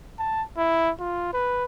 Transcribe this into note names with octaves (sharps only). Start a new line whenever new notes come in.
A5
E4
F4
B4